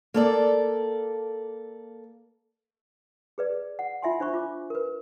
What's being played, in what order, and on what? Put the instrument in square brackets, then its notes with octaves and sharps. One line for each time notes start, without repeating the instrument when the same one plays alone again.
[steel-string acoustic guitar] A#3 A4 D5
[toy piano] G#4 B4 D5
F#5
F4 E5 G#5 C6
D4 C5 B5 C#6
F4 D6
A#4 B4